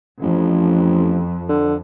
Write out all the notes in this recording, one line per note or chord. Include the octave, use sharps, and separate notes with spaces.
A1 F2
D3